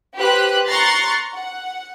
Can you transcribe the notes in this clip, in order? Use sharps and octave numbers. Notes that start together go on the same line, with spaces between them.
G4 B4 C5 F#6
A#5 C6 C#6 F#6 A6 C7
F#5